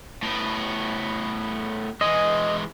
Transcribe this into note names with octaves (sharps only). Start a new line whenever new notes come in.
A2 B3
E3 G#3 D#5